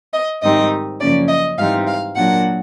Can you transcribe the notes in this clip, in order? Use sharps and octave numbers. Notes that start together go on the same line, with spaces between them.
D#5
G#2 D#3 G3 C4 D#4 D#5
F#2 C#3 F3 A#3 C#4 D5
D#5
G#2 E3 G3 C4 D#4 F5
F5
A#2 F#3 A#3 D4 F#5